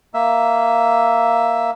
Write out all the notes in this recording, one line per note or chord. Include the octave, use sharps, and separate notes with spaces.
A#3 E5